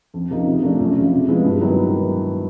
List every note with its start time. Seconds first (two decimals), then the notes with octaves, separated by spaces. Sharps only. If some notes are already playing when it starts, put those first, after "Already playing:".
0.14 F2
0.30 C#3 F3 A#3 D#4
0.46 C3
0.62 F3 A3 D4
0.80 F#2
0.95 C#3 F3
1.12 C3
1.28 F3 G#3 B3 E4
1.44 G2
1.61 D#3 F#3 B3 E4